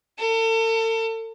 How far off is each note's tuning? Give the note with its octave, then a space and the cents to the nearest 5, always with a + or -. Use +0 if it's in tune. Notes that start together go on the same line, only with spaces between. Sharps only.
A4 +40